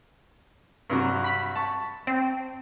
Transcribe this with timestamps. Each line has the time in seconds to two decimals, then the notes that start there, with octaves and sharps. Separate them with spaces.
0.90 G2 C3 F#3
1.24 B5
1.56 A5 C#6
2.07 C4